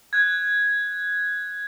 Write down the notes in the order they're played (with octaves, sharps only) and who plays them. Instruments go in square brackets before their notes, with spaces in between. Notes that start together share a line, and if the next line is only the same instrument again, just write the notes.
[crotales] F#6 G#6